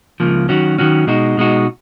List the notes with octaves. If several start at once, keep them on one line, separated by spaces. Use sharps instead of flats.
C#2 C#3 F3 A#3
D#3 F#3 C#4 F#4
D#3 F#3 C#4 F#4
B2 G#3 D#4 F#4
B2 G#3 D#4 F#4